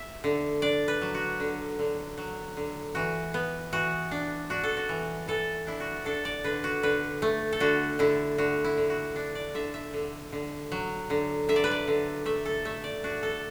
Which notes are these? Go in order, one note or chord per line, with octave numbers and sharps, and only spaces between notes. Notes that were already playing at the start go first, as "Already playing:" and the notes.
Already playing: E5
D3
D4 D5
B4
F#3
F#4
D3
D3
F#3
D3
E3 F#4
B3
E3 F#4
D4
D4 F#4
A4
F#4
E3
E3 A4
D4 E4
F#4
D4 A4
D5
D3 B4
F#4
D3 B4
A3
A4
D3 F#4
D3 E4
D3 F#4
E4
D3
F#4
D4
D5
D3 E5
E5
D3
D3
F#3
D3
D3 E5
D5
B4
D5
D3
A3 E5
A4
A3 E5
D5
D4 F#4
A4